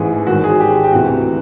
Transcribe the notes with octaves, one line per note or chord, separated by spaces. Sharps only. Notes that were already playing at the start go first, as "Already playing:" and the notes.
Already playing: A1 G#2 E3 G#4
G#1 G#2 D#3 F#4
G#4
G4
G4
D2 C3 E3 F#4